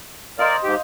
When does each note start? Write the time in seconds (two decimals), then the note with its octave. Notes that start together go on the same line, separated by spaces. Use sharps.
0.39 A#4 C5 D5 D#5 F5
0.64 G#2 G4